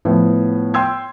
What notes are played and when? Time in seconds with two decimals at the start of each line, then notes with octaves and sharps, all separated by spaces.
0.05 A2 F3 B3
0.74 G5 C6 E6 G#6